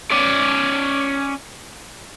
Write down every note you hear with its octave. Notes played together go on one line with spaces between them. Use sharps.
C#4 D5